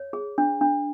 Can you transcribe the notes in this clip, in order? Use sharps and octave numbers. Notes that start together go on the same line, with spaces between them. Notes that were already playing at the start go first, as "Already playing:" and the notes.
Already playing: C#5
G#4
D4
D4